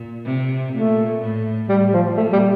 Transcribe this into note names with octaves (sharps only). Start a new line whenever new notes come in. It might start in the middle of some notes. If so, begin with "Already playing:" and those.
Already playing: A#2
C3
A#2 A3
A2
A2 G3
F3
A#2 A3
G3